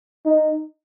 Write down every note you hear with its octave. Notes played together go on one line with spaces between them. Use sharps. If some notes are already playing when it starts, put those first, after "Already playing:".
D#4